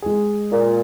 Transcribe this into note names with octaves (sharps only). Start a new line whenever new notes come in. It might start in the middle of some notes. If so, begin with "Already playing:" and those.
G#3 G#4
A#2